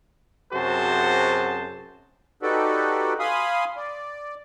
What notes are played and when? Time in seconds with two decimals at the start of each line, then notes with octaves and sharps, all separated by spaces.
0.53 F#2 C3 F#4 G#4 C5 A5
2.43 D#4 F#4 G4 A4 B4 D5
3.19 F5 G#5 B5 C6 D#6
3.77 D5